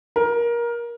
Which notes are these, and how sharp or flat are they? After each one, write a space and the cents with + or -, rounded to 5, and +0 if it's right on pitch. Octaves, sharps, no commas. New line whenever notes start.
A#4 +20